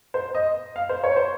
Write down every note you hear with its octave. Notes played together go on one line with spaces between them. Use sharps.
C5
D#5
F5
C5
C#5
C5